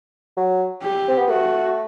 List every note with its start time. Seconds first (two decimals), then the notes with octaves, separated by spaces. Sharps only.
0.37 F#3
0.83 G4
1.09 C4
1.18 B3
1.30 A3 F#4